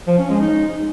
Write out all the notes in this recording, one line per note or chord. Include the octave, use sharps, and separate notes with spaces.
F3
C#4
G#3
D#4